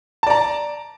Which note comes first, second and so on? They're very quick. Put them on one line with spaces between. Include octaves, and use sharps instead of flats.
A5 D5 A#5